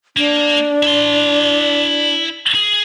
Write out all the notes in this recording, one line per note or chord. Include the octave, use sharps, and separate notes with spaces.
A#3 D4
E4 C6
G#4